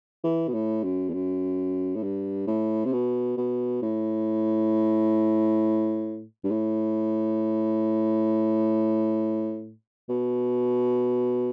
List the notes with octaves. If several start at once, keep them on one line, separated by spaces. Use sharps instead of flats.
E3
B2
A2
F#2
E2
F#2
A2
G2
A2
C3
B2
B2
A2
G2
A2
B2